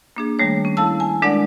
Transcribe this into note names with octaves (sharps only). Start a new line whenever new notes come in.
A#3 D4 G#4
D#3 G3 A3 C#5
C#4
E4 A4 F5 A5 E6
G#5
G#3 D4 A#4 D5 F#5